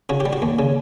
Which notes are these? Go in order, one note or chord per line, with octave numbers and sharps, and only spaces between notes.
C#3 F#4
G4
G3
F#4
D#2
C#3